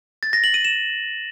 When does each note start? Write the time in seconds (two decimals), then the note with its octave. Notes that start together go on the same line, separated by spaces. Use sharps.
0.23 A6
0.33 A#6
0.44 F#7
0.54 D#7
0.65 E7